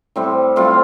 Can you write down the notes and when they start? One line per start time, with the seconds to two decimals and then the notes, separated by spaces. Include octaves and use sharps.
0.16 A2 G3 C4
0.56 A2 G3 C4 F4